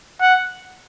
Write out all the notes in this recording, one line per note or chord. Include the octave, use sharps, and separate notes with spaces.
F#5